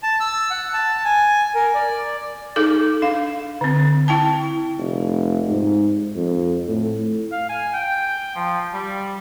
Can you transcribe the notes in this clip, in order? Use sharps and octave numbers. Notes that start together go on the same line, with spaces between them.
A5
E6
F#5
A5
G#5
A#4
D5
D#4 G#4 A4 D6
D4 F5
D3 C4
E4 G5 A5
F1
G#2
F2
A2
F5
G#5
G5
F3
G3